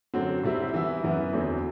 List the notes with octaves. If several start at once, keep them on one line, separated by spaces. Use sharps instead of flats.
F#2 D3 F#3 C4 F#4
C3 G3 C4 E4
E3 B3 E4
F#2 E3 B3
E2 D3 F#3 C4